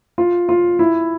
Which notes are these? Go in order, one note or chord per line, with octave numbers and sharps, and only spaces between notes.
F4
F4
E4